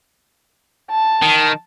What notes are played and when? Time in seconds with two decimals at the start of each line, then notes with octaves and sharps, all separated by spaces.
0.91 A5
1.22 D#3